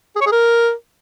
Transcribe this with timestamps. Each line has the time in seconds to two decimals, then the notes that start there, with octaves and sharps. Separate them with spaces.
0.16 G#4
0.21 C#5
0.27 G#4
0.32 A#4